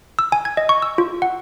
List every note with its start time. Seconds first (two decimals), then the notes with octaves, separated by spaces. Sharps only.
0.19 E6
0.32 G#5
0.45 G#6
0.57 D#5
0.69 C#6
0.82 E6
0.98 F4
1.22 F#5